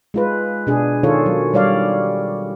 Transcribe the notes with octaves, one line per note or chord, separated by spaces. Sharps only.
G#3 F4 B4
B2 D4 G#4
D#3 F4 A4 C#5
F#3
G3 C#5 D5 F5